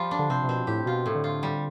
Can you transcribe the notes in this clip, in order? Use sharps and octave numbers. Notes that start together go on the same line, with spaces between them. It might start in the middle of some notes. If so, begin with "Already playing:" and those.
Already playing: F3 G3 F4
D4
D3
C3 C4
C3
B2 C4
A2 G4
B2 F4
A2
D3
F4
G3